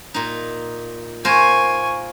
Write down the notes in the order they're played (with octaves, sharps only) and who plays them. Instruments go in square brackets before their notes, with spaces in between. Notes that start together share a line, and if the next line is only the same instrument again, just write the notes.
[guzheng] A#2 D#4
[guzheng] A#3 A#4 C5 [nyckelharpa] G#5 C#6